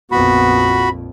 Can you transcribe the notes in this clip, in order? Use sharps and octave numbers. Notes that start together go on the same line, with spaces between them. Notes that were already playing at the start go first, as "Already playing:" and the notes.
A#1 F2 B3 F#4 B5